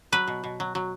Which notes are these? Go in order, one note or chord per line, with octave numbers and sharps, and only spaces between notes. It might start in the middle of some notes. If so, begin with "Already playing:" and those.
F#3 B4
B2
B2
F#3
F#3